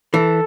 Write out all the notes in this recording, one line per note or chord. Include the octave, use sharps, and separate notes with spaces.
E3 A4